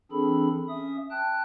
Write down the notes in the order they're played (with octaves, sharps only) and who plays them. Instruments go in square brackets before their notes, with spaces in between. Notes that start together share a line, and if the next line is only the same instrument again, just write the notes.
[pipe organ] E3 C4 D4 G#4 A4 B5
C#4 E5 D#6
G5 A5 F#6